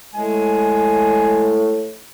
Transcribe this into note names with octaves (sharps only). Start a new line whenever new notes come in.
A2 G#3 G#5